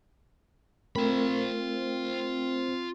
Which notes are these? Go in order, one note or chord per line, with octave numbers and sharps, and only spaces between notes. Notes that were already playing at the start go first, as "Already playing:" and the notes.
A3 C4 F4 A#4 B5